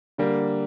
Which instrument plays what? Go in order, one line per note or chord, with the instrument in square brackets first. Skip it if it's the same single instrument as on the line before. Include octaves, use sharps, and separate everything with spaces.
[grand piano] D3 G3 A#3